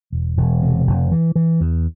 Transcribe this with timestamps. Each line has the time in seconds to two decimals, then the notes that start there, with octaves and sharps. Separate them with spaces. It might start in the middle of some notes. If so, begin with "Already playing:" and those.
0.12 E1
0.37 E1
0.62 C3
0.87 F1
1.12 E3
1.35 E3
1.61 E2